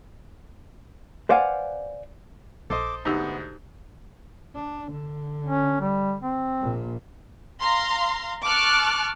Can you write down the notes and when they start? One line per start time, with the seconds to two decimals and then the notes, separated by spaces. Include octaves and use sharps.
1.29 B4 C5 D5 F5 F#5 G#5
2.70 A#1 A4 C5 D#5 D6
3.05 D2 G#2 B3 D#4 G4
4.56 D4
4.92 D3
5.46 C#4
5.81 G3
6.23 C4
6.62 A#1 A#2
7.61 F5 A#5 C6
8.43 A5 C#6 D6 F6 F#6